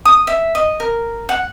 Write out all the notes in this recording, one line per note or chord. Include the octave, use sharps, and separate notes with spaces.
D#6
E5
D#5
A#4
F#5